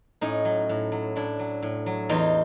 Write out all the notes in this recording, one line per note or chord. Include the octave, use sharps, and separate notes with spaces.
A2 C#4 D#4
F#3
A2
F#3
A2 D4 E4
F#3
A2
F#3
E2 D#4 F4